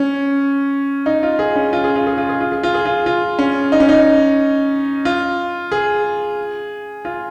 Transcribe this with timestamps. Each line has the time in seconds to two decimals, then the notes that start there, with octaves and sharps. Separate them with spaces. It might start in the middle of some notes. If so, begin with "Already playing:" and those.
Already playing: C#4
1.06 D#4
1.23 F4
1.39 G#4
1.56 C#4
1.73 F4
1.84 G#4
1.96 F4
2.07 G#4
2.18 F4
2.29 G#4
2.41 F4
2.52 G#4
2.63 F4
2.74 G#4
2.85 F4
3.06 F4
3.39 C#4
3.72 D#4
3.80 C#4
3.89 D#4
5.05 F4
5.72 G#4
7.05 F4